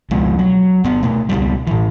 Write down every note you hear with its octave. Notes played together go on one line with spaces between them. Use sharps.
C#2 B2 F3 G#3
F#3
G1 B3
B2 A3
C#2 B2 G3
A2 E3